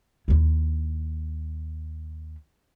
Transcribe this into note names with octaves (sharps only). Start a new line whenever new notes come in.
D#2 E4